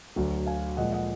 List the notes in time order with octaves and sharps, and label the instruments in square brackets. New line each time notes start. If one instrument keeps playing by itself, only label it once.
[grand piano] D2 D3 F#3
F5 G#5
A#2 F3 G#3 D#5 F#5
D#5 F#5